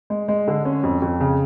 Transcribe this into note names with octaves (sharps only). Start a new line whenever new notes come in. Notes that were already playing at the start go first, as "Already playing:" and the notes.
G#3
G#3
D3
C#4
F2
F2
C#3